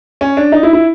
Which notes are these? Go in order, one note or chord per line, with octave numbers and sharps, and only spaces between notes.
C#4
D4
D#4
E4
E4